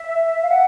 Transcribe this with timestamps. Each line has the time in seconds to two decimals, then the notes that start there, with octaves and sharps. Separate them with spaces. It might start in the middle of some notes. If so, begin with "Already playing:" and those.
Already playing: E5
0.42 F5
0.49 F#5